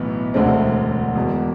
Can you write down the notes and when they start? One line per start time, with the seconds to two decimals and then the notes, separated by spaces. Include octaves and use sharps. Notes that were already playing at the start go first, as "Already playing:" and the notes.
Already playing: B1 A2 E3 B3
0.34 E1 D2 D3 A3 C4
1.15 E1 E2 B2